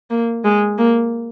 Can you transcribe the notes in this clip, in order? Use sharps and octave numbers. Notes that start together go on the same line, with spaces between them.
A#3
G#3
A#3